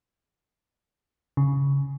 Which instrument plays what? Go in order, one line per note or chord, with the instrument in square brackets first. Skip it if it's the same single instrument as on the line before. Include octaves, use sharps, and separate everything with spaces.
[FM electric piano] C#3